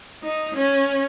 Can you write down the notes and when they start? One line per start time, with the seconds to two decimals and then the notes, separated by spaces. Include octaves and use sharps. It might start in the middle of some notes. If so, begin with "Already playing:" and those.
0.22 D#4
0.55 C#4